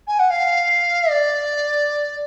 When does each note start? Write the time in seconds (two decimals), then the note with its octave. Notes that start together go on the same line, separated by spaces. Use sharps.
0.07 G#5
0.19 F#5
0.30 F5
1.10 D5